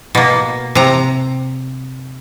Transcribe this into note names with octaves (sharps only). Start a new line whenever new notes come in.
B2 A#3
C3 A#5